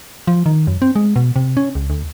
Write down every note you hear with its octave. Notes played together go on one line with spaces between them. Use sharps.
F3
D#3
F#2
C4
G#3
B2
C3
C#4
C#2
D2